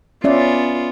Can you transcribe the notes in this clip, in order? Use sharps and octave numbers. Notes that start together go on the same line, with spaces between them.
B3 C#4 F4 D5 E5